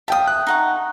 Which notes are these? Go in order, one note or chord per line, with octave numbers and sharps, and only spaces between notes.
E5 F5 G5 A5 D#6
F#6
D#4 F#5 C#6